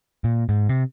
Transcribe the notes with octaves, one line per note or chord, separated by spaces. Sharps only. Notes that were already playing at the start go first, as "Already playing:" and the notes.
A#2
G#2
C3